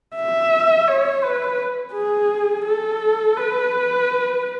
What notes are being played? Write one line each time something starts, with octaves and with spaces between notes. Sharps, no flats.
E5
C#5
B4
G#4
A4
B4